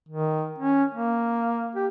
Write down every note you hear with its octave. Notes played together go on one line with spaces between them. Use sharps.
D#3
C#4
A#3
G4